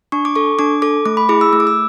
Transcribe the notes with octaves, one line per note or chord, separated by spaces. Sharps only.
D4 C#6
D6
A4 C#6
D4 D6
A4 D6
A3 D6
B5
E4 G#4 D6
E6
A3 E6
D6
E6